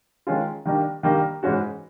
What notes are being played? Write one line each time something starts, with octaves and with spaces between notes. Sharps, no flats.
D#3 G#3 C#4 F4
D#3 G3 A#3 D4
D#3 G3 A#3 D4
G#2 E3 G#3 C#4 F#4